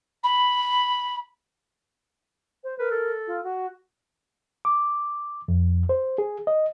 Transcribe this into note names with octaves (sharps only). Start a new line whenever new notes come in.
B5
C5
A#4 B4
A4
F4
F#4
D6
F2
C5
G#4
D#5